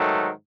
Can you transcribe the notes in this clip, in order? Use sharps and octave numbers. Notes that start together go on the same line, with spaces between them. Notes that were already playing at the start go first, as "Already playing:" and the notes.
Already playing: G#2 D#3 F#3 A3